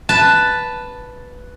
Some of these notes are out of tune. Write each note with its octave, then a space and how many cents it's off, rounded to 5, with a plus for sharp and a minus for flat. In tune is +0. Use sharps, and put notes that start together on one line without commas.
B4 +0 A5 +0